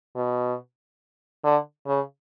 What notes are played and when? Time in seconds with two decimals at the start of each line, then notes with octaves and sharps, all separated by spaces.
0.16 B2
1.43 D3
1.87 C#3